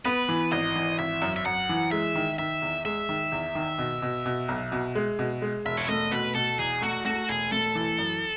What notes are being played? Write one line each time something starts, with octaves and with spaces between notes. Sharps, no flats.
B3 B4
E3
G#1 D#5
E3
G#1 E5
F#2
E5
F#2 F#5
E3
G#3 E5
D#3
D#3 E5
E2
G#3 E5
D#3
E2
D#3
B2
B2
B2
B1
B2
G#3
B2
G#3
E1 E5
C#5
A3 D#5
B2 B4
B2 A4
E2 G#4
A3 F#4
A3 F#4
E1 G#4
A3 A4
E3
F#2